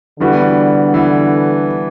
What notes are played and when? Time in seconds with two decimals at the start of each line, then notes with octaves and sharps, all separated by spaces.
0.20 D3 E3 G3 B3 F#4
0.94 E3